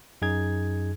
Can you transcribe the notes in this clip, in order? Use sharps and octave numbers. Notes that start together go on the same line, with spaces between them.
F#2 D#4 G#4 G#6